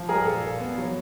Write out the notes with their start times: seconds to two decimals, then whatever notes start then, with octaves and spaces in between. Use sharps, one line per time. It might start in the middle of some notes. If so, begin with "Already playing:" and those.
Already playing: F3
0.09 G3 G#4 A#4
0.25 A#2 A4
0.43 A#2
0.60 B3
0.78 F#3